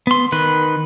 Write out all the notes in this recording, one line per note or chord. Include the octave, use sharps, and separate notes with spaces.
B3 C6
D#3 B4